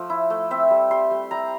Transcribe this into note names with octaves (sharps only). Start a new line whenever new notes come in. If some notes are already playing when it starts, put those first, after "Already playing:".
Already playing: F3 A3
E4
A3
C4 E5
G3
G3 C6
G3
G3 A#5